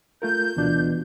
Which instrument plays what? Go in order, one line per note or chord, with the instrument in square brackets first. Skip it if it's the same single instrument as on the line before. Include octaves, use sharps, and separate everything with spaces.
[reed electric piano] A3 F4 A#4 [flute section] G6
[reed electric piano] D2 D4 F4 [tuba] B2 [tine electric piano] E3